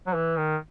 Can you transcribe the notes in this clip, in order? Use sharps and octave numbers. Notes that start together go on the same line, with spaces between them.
F#3
E3
D#3